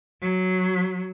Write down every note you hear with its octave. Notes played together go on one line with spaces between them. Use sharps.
F#3